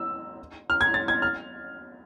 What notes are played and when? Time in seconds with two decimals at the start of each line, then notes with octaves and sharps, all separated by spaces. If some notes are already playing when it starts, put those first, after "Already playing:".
Already playing: E6
0.70 F6
0.81 G#6
0.94 A6
1.08 G#6
1.22 F6